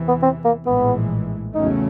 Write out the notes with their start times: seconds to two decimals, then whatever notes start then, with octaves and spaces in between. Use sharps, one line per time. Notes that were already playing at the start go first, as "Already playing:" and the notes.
Already playing: E2 C3 E3
0.08 B3
0.23 C4
0.45 A#3
0.66 A#1 A2 E3 G#3 B3
1.55 E2 C#3 F#3 A3 C#4 D#4